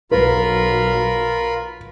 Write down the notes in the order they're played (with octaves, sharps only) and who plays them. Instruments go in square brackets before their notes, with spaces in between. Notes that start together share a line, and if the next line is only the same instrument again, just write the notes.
[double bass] B1 [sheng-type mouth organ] F4 A#4 B5 [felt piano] B4